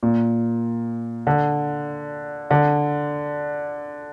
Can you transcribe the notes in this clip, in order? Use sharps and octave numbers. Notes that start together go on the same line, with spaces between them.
A#2
D3
D3